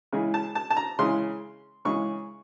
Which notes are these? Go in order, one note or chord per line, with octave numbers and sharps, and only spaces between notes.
C#3 E3 G#3
A5
A5
A5
A#5
C#3 E3 G#3 C6
C#3 E3 G#3 C#6